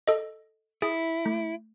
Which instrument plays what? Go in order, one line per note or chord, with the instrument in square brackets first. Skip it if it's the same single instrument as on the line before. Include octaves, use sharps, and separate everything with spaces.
[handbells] A4 D#5
[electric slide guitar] E4 [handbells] G#4
[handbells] A3